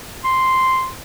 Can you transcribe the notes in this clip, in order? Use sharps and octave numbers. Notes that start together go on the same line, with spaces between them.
C6